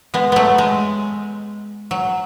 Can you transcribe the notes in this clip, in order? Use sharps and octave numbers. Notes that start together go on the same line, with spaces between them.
G#3 B3
F#3 A3 B3
G#3
F#3